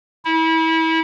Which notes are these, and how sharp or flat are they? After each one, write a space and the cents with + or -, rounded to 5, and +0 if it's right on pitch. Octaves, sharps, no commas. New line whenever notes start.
E4 -30